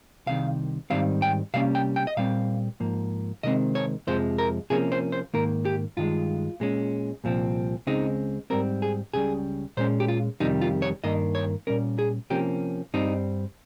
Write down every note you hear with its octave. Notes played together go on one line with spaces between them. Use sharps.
C2 C3 D#3 F5
G#2 D#3 G3 C4 F5
G5
C3 G3 A#3 C#4 F5
G5
G5
D#5
A#2 G3 C4 F5
G#2 F3 A#3
C3 D#3 G#3 C4 D#5
C#5
F2 C3 F3 G#3 C5
A#4
C3 F3 A#3 C#4 G#4
C5
C5
G#2 D#3 A#3 A#4
G4
G2 D#3 G#3 F4
A#2 G#3 C#4
C2 A#2 F3 C4
C#2 C#3 G#3 C4 D#4
G#2 G3 C4 A#4
G#4
C#2 C#3 G3 G#4
A#2 G#3 C#4 C5
G4
F4
F2 C3 D#3 G3 D#4
F4
C#5
G2 D#3 A#3 D#5
C#5
A#2 G3 C#4 A#4
G#4
C3 F3 A#3 C#4 G4
G2 G3 C4 D#4